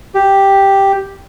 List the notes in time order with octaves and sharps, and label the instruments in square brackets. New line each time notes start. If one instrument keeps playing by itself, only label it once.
[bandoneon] G4